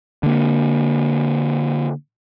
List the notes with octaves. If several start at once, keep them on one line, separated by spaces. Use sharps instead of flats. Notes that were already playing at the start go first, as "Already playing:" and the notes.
D3 A#3